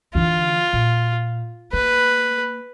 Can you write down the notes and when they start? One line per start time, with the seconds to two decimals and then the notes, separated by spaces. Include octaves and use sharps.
0.15 D3 E3 F4
0.73 A#2
1.73 A#3 B4